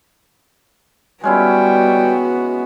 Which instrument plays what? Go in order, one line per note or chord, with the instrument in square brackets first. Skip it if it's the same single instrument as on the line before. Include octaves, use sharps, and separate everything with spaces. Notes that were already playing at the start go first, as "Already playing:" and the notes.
[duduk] G3 [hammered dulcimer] G#3 C#4 E4 [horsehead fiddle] B3 F#4 [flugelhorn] G5